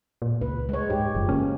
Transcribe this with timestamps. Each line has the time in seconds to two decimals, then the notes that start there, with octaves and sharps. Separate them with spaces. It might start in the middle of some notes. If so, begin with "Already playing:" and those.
0.22 A#2
0.41 C#2 B4
0.69 G#3 C#5
0.90 G#2 G4
1.15 F#1 F3
1.29 C#3 A#3 C#4